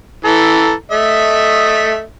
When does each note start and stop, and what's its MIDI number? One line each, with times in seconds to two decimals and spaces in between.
0.25 0.73 52
0.25 0.73 69
0.25 0.73 82
0.91 2.02 57
0.91 2.02 75
0.91 2.02 76